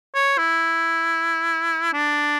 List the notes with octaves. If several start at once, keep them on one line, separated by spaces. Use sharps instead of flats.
C#5
E4
D4